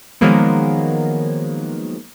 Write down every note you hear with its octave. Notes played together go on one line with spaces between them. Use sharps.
D#3 F3 F#3 G#3 A#3 B3